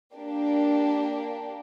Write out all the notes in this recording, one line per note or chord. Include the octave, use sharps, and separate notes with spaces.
A#3 D4 G4